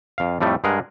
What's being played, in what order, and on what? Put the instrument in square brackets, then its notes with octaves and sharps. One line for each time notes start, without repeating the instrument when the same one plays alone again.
[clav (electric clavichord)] F2 F5
F2 A2 G3 A3
G2 G#3 G#4 A#4 F#5